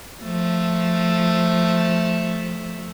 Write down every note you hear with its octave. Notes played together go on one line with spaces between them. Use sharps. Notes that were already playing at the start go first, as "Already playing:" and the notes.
F3 A3